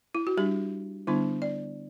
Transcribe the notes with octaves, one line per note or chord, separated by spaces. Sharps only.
E4
F#4
G3 D4 G4
D3 G3 B3 D4 E4
D5